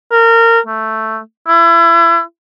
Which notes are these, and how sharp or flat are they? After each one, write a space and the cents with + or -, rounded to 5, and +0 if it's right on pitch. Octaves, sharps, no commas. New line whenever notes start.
A#4 -25
A3 +5
E4 +30